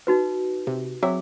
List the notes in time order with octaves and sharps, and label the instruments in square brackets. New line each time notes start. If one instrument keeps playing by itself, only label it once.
[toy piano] D#4 F#4 B4
[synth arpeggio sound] C3
[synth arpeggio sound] F#3 C4 E5 [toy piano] G#4